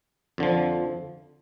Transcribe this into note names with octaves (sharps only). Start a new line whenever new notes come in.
F2 D3 F3